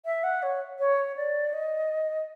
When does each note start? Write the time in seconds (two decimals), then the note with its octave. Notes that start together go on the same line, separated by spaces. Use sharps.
0.06 E5
0.24 F#5
0.42 C#5
0.79 C#5
1.16 D5
1.53 D#5